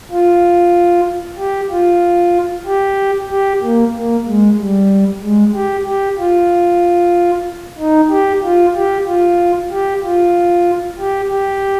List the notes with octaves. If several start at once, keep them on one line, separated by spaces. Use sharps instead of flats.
F4
G4
F4
G4
G4
A#3
A#3
G#3
G3
G#3
G4
G4
F4
D#4
G4
F4
G4
F4
G4
F4
G4
G4